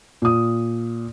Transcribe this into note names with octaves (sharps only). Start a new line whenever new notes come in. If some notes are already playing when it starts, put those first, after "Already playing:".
A#2 D#6